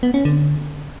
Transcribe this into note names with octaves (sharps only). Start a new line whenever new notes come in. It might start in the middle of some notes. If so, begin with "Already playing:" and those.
B3
C#4
D3